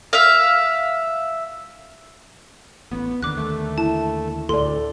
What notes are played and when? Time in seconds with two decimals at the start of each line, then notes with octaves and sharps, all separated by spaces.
0.13 E5 F5
2.91 A1 B3
3.23 D#2 D3 D#3 D6 F#6
3.37 A3
3.78 E4 A5
4.49 D2 A2 A4 D5 C6